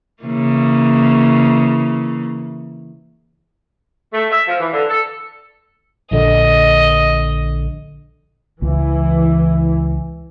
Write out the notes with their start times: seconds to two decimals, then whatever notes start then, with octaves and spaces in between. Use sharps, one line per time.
0.23 C#3 E3 A#3
4.13 A3
4.32 E5
4.46 F3
4.59 E3
4.72 D3
4.88 A4
6.11 A#1 D3 D#5
8.62 C#2 E3